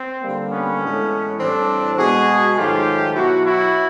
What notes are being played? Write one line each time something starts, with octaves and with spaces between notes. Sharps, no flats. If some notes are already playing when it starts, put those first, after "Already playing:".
Already playing: C4
D3 G3 A#3
B3 C#4
A2 E3 G#3 B3
A2 E3 G3 C4 D4
B2 G#3 B3 F#4 G#4
G#2 D#3 F#3 A3 F4 G4
B2 F#3 B3 E4 F#4
E4 F#4